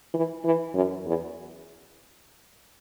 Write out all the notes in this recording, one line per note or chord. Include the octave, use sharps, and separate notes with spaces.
E3
E3
F#2
E2